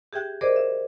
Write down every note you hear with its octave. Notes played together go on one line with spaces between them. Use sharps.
G4 G#4 E5 G5 F#6
G#4 A#4 C5 D5 D#5 D6
E5